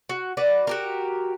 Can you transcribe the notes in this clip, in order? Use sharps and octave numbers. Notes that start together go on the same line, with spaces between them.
F#4
F#4 B4 D5
F#4 G4 A#4